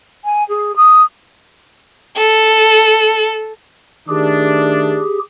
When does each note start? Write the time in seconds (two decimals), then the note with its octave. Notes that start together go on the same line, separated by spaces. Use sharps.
0.24 G#5
0.49 G#4
0.76 D#6
2.17 A4
4.09 D#3 A3 D4 G4 G#4